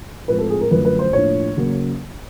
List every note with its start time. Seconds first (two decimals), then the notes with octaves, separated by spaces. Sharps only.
0.28 A2 F3 G#3 C4 B4
0.39 A4
0.50 G#4
0.61 A#4
0.71 F#2 D3 F3 A3 B4
0.85 B4
0.99 C5
1.13 A2 F3 A#3 D4 C#5
1.57 C#3 F#3 A#3 C#4